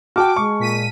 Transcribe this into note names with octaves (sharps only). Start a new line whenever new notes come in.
F#4 G5 A5 D6 F6
G#3 C#6
A#2 B6 D#7